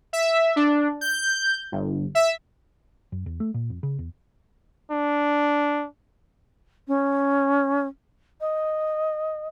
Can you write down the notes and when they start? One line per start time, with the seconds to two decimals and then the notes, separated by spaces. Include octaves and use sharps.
0.13 E5
0.56 D4
1.01 G6
1.72 G1
2.15 E5
3.12 F#2
3.26 E2
3.40 A3
3.54 A#2
3.70 F2
3.83 C#3
3.99 E2
4.91 D4
6.88 C#4
8.41 D#5